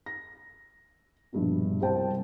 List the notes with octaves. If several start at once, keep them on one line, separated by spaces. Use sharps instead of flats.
A#6
A#1 G2 B2
C2 C3 G3 C5 G5 A5